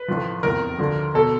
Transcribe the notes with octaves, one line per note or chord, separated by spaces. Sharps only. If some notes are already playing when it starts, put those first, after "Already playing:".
Already playing: B4
A1 A2 F3
F1 E2 C3 F3 A#4
D2 D3 F3
B2 A4